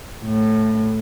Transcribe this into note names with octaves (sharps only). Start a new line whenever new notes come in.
A2